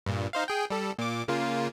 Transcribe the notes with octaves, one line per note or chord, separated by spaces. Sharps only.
G2 A#2
D#4 C5 F5
G#4 G5
G3 A4
A#2 D6
C#3 A#3 F4